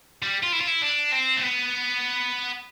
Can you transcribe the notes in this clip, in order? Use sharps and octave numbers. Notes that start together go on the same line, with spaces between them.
G3
F4
E4
F4
E4
D4
C4
A3
B3